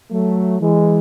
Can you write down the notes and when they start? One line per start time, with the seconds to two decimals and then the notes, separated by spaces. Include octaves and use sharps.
0.10 F#3 A3
0.61 E3 G#3